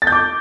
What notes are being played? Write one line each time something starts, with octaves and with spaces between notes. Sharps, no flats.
A6
G6
D6